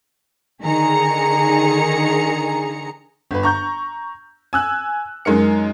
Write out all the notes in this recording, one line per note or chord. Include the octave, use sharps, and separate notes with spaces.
D3 D#3 G#4 A#5 C#7
G1 B4
A#5 C#6 G6
G#5 E6 F#6
F#2 G#3 D#4 A#4 C#7